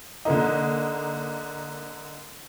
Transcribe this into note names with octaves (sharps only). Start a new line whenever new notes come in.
D3 A#3 D#4